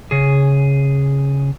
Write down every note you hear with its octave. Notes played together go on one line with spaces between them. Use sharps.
C#3 G#4